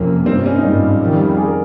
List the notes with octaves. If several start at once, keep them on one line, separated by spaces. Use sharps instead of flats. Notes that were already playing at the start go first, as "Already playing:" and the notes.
Already playing: F2 C3 F3 A#3 C#4
G2 G3 A#3 C4
C4
C#4
D#4
G#1 G2 G3 C#4 F4
F2 C3 D#3 G3
G#4
A#4